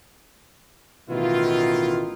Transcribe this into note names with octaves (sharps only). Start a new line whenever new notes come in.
A1 B2 D#3 E4 F4